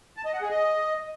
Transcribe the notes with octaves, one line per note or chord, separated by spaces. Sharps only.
A5
D#5
F#5
G#4
D#5